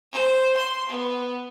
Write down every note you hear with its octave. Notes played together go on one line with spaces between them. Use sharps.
C5
C6
B3